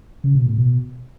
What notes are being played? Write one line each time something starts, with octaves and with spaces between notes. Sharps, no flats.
C#3
B2
A2
B2